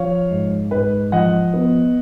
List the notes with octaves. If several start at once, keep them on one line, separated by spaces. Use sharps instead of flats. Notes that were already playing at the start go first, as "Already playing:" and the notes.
Already playing: F3 C#5 F5
G#2
G#2 B4
F3 D#5 F#5
B3